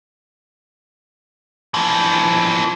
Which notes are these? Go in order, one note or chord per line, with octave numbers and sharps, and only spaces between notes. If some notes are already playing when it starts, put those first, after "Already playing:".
E3 F3